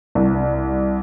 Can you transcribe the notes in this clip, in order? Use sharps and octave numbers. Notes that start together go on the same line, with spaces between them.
C2